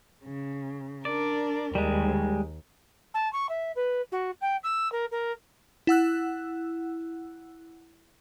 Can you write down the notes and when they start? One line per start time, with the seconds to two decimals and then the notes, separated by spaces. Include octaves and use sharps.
0.25 C#3
1.05 D4 A#4 D5
1.75 D#2 G3 G#3
3.14 A5
3.32 C#6
3.49 E5
3.75 B4
4.11 F#4
4.41 G5
4.63 E6
4.92 A#4
5.11 A#4
5.87 E4 F#5 E6 F#6